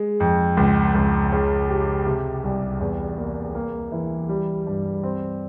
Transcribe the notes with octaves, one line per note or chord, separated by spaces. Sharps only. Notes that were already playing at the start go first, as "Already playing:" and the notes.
Already playing: G#3
F2
C#2
C#2
C#3
G4
C3
C2
E2
A#3
A#3
E3
G3
G2
C4